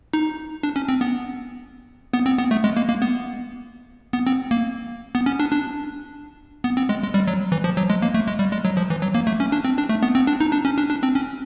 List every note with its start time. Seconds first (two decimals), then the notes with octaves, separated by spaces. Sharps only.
0.14 D#4
0.63 D4
0.76 C#4
0.89 C4
1.01 B3
2.14 B3
2.26 C4
2.38 B3
2.51 A3
2.64 G#3
2.77 A#3
2.89 A#3
3.02 B3
4.13 B3
4.27 C4
4.51 A#3
5.15 B3
5.26 C#4
5.40 D4
5.52 D4
6.64 B3
6.77 C4
6.89 G#3
7.03 G#3
7.14 G3
7.28 F#3
7.52 E3
7.64 F3
7.77 F#3
7.90 G#3
8.02 A#3
8.14 A3
8.28 G#3
8.39 G3
8.52 G#3
8.65 F#3
8.77 F3
8.90 E3
9.02 F#3
9.15 A#3
9.27 A3
9.40 C#4
9.52 D4
9.65 C4
9.78 D4
9.89 A3
10.03 B3
10.15 C4
10.27 D4
10.40 D#4
10.52 D4
10.65 C#4
10.78 D4
10.90 D4
11.03 C4
11.15 C#4